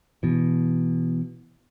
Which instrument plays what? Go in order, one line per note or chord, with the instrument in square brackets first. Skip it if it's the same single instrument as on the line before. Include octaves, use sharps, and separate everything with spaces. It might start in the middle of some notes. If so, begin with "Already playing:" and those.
[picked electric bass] B2 E3